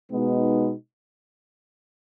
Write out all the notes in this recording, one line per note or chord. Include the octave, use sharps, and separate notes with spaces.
B2 G#3 B3 D#4